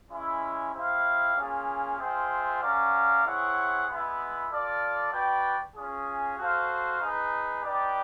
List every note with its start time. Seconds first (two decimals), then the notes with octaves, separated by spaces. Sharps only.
0.11 G#3 C#4 E4
0.73 C4 E4 G4 C5 F5
1.36 A#3 C#4 F4 G#4
1.99 F4 G#4 C5 E5 G5
2.61 C#4 F#4 A#4 D5 F5
3.24 C4 E4 G#4 C#5 F#5
3.87 G#3 B3 E4
4.50 F4 A4 D5 F5
5.12 F#4 B4 D5 G5
5.75 C#4 F4 G#4
6.38 F#4 A4 C5 F5
7.01 D#4 G#4 B4
7.63 D#4 G4 B4 D5